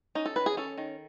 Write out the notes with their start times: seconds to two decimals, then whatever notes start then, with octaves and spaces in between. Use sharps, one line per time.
0.15 C#4 D#4
0.26 A4
0.36 D#3 B4
0.46 G#4
0.57 C#4 A4
0.78 D#3